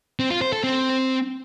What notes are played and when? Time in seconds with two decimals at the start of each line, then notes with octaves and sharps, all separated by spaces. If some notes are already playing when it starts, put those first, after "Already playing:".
0.20 C4
0.31 F4
0.42 C5
0.53 A4
0.64 C4